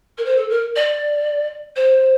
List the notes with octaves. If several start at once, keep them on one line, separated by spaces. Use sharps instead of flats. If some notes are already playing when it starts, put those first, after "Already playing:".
A#4
C5
A4
A#4
D5
C5